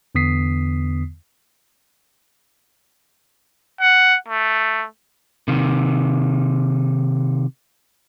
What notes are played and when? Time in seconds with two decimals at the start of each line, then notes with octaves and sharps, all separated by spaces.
0.15 E2 D3 B3 D#6 B6 C7
3.81 F#5
4.28 A3
5.48 C3 D#3